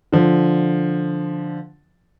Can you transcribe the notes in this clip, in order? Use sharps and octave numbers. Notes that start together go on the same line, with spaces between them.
D3 F3